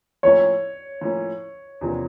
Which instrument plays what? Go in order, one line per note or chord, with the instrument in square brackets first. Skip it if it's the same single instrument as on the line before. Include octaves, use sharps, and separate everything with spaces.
[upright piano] A2 F3 A#3 C#4 [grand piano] C#5
[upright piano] A2 F3 A#3 C#4
E2 C3 F3 A#3 D4